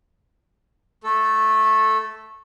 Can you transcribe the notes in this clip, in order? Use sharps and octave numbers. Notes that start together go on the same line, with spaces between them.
A3 A4